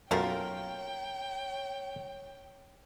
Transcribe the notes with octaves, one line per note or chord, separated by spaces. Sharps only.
B1 F#2 A3 A#3 F4 A#4 C#5 G5